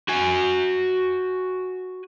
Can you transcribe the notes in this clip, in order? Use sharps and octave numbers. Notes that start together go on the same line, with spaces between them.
F#4 G#5